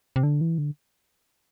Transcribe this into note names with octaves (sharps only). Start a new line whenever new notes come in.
C3
D3
E3
D3